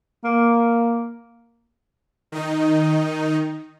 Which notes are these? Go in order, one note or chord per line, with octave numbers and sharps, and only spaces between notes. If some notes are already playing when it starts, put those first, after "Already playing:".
A#3
D#3 D#4